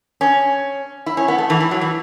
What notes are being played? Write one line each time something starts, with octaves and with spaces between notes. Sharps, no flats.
C#4
E4
C#4
B3
A3
E3
E3
F#3
E3